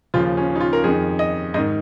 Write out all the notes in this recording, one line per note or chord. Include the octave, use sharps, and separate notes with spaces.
D#2 C#3 F3 F4
C#4
D#4
F4
A#4
F2 D#3 G#4
D#5
G#2 D#3 D#5